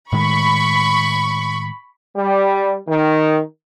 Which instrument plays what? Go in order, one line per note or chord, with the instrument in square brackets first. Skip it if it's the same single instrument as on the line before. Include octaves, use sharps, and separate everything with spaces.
[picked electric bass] A2 D#3 G#3 [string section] B5 C#6
[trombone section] G3
D#3